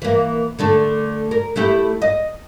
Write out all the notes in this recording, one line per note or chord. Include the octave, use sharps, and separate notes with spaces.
E3 A#3
D3 A3 A4
A#4
A3 E4 G4
D#5